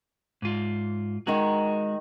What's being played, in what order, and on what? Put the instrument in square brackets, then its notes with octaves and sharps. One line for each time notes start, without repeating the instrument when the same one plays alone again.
[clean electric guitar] G#2 F4
[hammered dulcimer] D#3 D#4 A#5 [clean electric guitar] G#3 F#4